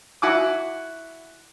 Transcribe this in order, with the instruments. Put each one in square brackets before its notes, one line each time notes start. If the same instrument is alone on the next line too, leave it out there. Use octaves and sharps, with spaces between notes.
[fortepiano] E4 F#4 G#5 D6